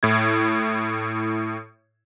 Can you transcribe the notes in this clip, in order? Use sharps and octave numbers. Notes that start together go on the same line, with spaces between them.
A2 E4 G#6